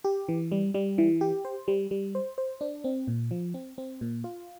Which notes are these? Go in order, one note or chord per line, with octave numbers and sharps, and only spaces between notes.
G4
E3
G3
G3
E3
G4
C5
G3
G3
C5
C5
D4
C4
A#2
F3
C4
C4
A#2
F4